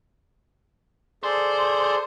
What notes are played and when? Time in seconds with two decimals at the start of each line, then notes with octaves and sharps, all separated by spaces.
1.23 G#4 A4 C5 D5